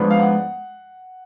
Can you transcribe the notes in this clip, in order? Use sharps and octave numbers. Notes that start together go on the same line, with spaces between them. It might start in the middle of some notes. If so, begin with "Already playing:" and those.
Already playing: G#2 F3 B3 D4
F5
F#5